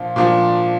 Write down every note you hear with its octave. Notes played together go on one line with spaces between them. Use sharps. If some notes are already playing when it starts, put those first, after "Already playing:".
Already playing: A#2 F3 D4 F4
A#2 F3 D4 F4